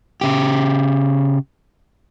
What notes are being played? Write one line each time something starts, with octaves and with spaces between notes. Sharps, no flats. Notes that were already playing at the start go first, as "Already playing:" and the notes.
C#3 G4